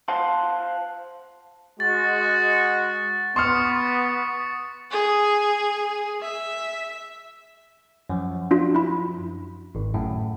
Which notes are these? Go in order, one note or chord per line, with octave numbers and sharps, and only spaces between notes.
C5 F5 F#5 A5 C6
G#3 F#4 A6
B3 C6 C#6 D#6 F6 C#7
G#4
E5
F#2 F3
D4 F4 F#4
E4 B5
G#1
F#2 A2